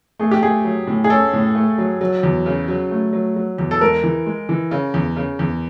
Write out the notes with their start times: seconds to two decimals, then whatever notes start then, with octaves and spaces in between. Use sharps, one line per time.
0.19 A3 G#4
0.31 G4
0.42 A3 G#4
0.64 F#3
0.87 A2
1.04 G#4
1.10 C#4 A4
1.33 A2
1.55 A3
1.78 F#3
2.01 F#3
2.23 E2
2.46 C#3
2.68 F#3
2.91 A3
3.13 F#3
3.36 F#3
3.58 E2
3.71 A4
3.81 G#3 A#4
4.04 E3
4.26 G#3
4.49 E3
4.71 C#3
4.94 E2
5.17 C#3
5.39 E2